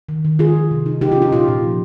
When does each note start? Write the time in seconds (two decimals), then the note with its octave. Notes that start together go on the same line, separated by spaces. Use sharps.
0.09 D#3
0.25 D#3
0.39 D#3 F4 G#4
0.55 D#3
0.71 C3
0.86 D#4
1.01 C#3 D#4 G4
1.12 F4
1.17 C#4
1.22 D#4
1.32 A#2 F4
1.48 A#2
1.63 F3